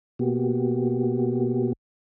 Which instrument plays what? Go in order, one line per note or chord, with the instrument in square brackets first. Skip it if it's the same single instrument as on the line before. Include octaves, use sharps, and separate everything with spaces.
[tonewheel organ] B2 A#3 B3 F#4 G4